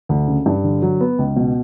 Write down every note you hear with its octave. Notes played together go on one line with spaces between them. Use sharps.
D2
C#3
G2
D3
F#3
B3
C#2
B2